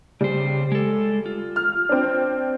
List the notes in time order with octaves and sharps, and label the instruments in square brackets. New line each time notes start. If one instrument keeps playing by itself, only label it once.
[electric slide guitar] C#3 C5 [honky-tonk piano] G3
[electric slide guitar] G#3 A4
F4
[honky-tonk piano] F6
C4 D4